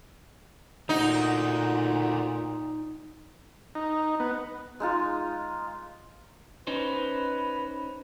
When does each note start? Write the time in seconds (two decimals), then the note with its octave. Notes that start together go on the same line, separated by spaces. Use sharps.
0.89 A#2 A3 D#4 F#4
3.75 D#4
4.20 B3
4.80 G#3 D#4 F4
6.67 C#4 D#4 B4 C5